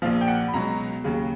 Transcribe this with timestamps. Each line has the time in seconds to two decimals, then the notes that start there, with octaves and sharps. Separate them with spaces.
0.02 A#1 A#2 F3 F5
0.21 G5
0.28 F#5
0.48 B5
0.53 C#2 B2 F#3 A#5
1.04 D#2 C#3 F#3